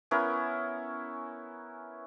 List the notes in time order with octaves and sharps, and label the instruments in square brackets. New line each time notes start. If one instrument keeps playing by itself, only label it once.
[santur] B3 C#4 E4 A#4